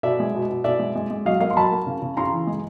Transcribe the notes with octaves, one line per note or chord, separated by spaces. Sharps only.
B2 D5 E5
G#3
B2
B2
B2 D5 E5
G#3
G#3
G#3
F#3 D#5 F5
A#3 D#5 F5
C6
F#3 A5 B5
A#3
C#3
C#3
C#3 A#5 C6
E3
G#3